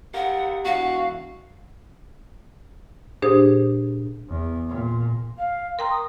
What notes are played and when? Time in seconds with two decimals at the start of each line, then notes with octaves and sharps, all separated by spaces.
0.14 G4 A#4 F5 F#5
0.65 B2 E3 F#4 F5
3.22 A#2 D4 G4 G#4 C5 D#6
4.29 E2
4.69 A#2
5.38 F5
5.79 A#4 G5 A#5 C6
5.90 D#6